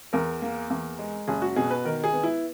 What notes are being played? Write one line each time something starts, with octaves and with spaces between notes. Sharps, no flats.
E2 A#4
A#3
E2
G#3
F#1 G#4
F#4
B2 G#4
B4
D#3 A#4
G#4
B3
E4